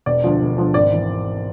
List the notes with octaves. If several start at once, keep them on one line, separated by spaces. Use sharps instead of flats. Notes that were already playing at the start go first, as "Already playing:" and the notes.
E1 D5
D2 D3 F3
E1
D2 D3 F3
G#1 D5
E3